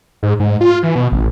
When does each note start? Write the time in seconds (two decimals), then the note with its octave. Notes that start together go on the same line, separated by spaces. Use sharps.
0.23 G#2
0.40 G#2
0.61 F4
0.83 E3
0.95 B2
1.12 A1